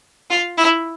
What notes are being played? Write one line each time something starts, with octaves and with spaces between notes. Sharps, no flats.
F4
E4